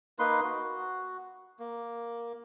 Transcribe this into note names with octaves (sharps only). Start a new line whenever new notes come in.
A#3 D#4 B4 C6
F#4
A#3